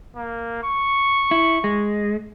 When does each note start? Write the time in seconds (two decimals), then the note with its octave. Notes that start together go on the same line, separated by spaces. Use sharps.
0.16 A#3
0.63 C#6
1.31 E4
1.64 G#3